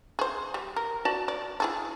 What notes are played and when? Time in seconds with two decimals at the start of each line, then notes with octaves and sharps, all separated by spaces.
0.19 G#4 C5
0.54 G3
0.76 A#4
1.05 F#4 D5 A5
1.28 D5
1.60 E4 G#4 A4